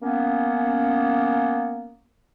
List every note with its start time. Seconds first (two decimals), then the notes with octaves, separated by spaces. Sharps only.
0.02 A#3 B3 C#4